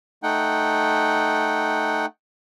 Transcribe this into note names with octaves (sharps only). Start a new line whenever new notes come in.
A3 D#4 F#5 G5